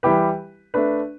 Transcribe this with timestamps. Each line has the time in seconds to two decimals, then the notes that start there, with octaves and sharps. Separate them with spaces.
0.03 E3 G3 E4 G4 B4
0.74 A3 D4 B4